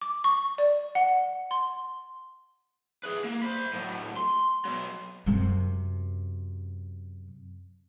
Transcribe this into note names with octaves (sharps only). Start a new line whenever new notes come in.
D6
C#6
D5
F#5
C6
G#4 B4
A#3
C5 B5
A2 F#3
C6
F#3 B3
F#2 C3